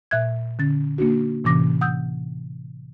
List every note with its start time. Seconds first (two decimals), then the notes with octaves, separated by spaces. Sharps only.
0.11 A#2 E5 F#6 G#6
0.59 D3 C#4 A6
0.98 A#3 D4 F#4
1.44 A2 C3 E3 C#4 D6 A#6
1.81 F#5 D#6 E6 G6